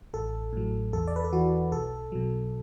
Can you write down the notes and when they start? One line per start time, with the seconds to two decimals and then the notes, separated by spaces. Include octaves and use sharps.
0.14 A1 A4
0.53 A2 F#3
0.93 E2 A4
1.07 D5
1.16 B4
1.24 A4
1.33 E3 F#4
1.72 B1 A4
2.12 B2 F#3